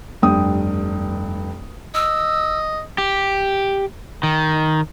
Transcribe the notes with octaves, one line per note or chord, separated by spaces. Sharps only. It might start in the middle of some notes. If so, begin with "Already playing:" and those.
F1 G2 G5 D#6
D#5 E6
G4
D#3